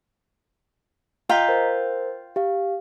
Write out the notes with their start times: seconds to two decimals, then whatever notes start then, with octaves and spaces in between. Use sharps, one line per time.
1.29 F4 D#5 F5 G5 A#5 B6
1.49 A#4 C5
2.36 G4 F5